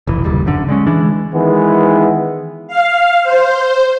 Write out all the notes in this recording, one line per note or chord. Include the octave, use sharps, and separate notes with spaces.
F1 B1 E3
F#1 D#2 G3
D#1 F#2 D3
D3 G#3 C#4
E3 G#3 D4
D#3 E3 G#3 B3
F5
C5